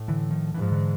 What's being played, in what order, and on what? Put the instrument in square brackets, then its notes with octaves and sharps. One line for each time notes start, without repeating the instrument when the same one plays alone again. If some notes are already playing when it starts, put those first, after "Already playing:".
Already playing: [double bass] A2
[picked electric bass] D3 E3
D#3 F3
[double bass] G#2 [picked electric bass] E3
[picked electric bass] F3
D3 E3